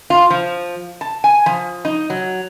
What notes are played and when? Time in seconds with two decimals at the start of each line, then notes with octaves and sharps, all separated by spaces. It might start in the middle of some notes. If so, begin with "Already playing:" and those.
0.10 F4
0.30 F3
1.01 A5
1.24 G#5
1.46 F3
1.85 D#4
2.10 F#3